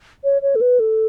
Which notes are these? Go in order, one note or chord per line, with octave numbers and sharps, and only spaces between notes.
C#5
C#5
A4
B4
A4